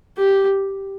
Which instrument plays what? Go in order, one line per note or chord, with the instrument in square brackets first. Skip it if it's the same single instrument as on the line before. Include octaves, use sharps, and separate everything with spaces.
[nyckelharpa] G4